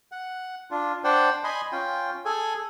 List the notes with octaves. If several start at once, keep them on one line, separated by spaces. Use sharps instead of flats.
F#5
D4 F4
D4 C5 D5 F#5 G5
D#5 G#5 B5 C6
C#4 F4 G5
G#4 A4 G#5